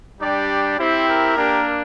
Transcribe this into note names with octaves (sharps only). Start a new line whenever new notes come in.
G3 D4 G4 D5
C4 E4 G4 C5
A#4
A#3 D4 G4